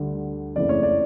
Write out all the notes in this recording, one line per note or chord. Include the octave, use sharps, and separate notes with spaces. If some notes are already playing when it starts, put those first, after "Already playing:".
Already playing: D2 D3 G3
F#1 F2 C#3 E3 A3 D5
C#5
D5